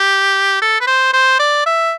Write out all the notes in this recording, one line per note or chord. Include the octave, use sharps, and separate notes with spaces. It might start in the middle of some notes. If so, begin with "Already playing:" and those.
Already playing: G4
A4
B4
C5
C5
D5
E5